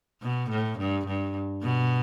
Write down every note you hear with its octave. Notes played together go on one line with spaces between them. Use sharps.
B2
A2
G2
G2
B2